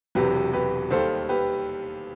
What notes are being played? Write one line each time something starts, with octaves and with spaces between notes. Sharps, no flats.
E1 E2 C3 F#3 G4 B4
G4 B4
D#2 D#3 G3 A4 C5
G4 B4